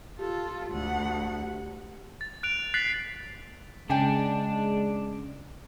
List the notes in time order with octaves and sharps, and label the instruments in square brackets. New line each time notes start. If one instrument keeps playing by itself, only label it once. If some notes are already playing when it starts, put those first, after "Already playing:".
[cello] F4 A4 [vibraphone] G4
[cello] D2 F#5
[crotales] A6
F#6 D7 F7
F#6 A6 B6 C7 F#7
[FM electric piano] C#3 [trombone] G#3 [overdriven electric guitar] D4 [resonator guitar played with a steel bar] D5 G5 G#5